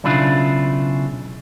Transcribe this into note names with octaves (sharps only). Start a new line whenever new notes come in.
B1 C#3 D4 E4 F4